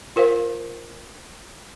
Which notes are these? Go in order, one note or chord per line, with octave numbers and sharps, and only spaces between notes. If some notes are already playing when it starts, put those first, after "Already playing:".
F4 A#4 C5 F5